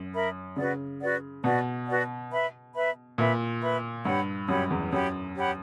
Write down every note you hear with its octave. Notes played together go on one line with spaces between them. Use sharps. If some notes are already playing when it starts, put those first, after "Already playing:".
Already playing: F#2
A#4 E5 B5
C#3 F#4 B4 D5 F#5
F#4 B4 D5 F#5
B2 F#4 B4 D5 F#5
F#4 B4 D5 F#5
B4 E5 B5
B4 E5 B5
A#2 B4 E5 B5
B4 E5 B5
G2 G4 C#5 F#5 B5
F#2 G4 C#5 F#5 B5
E2
F#2 G4 C#5 F#5 B5
G4 C#5 F#5 B5